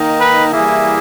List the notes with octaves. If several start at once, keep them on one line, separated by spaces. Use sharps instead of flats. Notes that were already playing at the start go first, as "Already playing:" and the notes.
Already playing: D#3 A#3 D#4
B4
E3 G3 A#3 E4 G#4